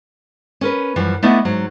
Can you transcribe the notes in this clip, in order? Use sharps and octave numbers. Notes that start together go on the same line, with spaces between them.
C#4 A#4 B4
F#2 E3 F3 G3
A3 B3 D4 E4 D#5 F#5
G#2 F#3